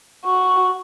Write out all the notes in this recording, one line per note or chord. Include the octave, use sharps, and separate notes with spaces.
F#4 C#6